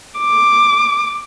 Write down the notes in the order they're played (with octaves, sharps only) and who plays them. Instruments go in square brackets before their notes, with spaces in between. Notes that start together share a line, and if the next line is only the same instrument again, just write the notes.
[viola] D6